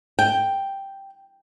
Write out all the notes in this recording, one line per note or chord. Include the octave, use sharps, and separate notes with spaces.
G5